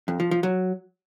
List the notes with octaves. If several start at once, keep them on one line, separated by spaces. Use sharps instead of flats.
F2
F3
F3
F#3